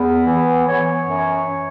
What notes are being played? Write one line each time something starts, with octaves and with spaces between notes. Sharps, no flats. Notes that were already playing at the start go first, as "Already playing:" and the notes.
Already playing: E2 B3
E3
E3 C#5
F#2